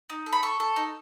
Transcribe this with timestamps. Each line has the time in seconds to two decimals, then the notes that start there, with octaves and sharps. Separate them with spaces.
0.10 D#4
0.26 A4
0.33 B5
0.43 A4 C#6
0.60 A4
0.76 D#4